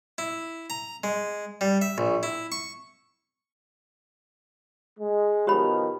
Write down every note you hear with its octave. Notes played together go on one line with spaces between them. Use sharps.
E4
A#5
G#3
G3
E5
A#1
E4
C#6
G#3
B2 D#3 F3 G4 C#5 B5